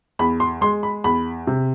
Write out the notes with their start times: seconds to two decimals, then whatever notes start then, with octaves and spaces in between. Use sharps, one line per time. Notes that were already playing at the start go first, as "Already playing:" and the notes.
0.19 E2 B5
0.40 C6
0.61 G#3 C6
0.83 B5
1.04 E2 B5
1.47 C3